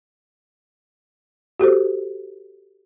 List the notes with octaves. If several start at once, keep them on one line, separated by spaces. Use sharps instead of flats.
F#4 G4 A4 C5